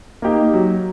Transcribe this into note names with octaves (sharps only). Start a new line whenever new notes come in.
A#3 D#4 G4
F#3